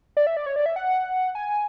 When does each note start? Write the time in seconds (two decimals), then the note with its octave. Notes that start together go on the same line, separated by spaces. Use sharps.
0.17 D5
0.27 E5
0.37 D5
0.46 C#5
0.56 D5
0.66 E5
0.76 F#5
1.35 G#5